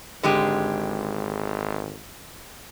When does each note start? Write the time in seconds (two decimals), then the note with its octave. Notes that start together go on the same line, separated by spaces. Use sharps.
0.23 G#1 D3 G#3 G4